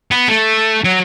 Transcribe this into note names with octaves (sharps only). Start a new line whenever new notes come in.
B3
A3
F#3